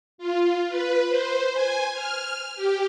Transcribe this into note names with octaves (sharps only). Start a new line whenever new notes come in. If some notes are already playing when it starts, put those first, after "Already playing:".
F4
B4
C5
G#5
F6
G4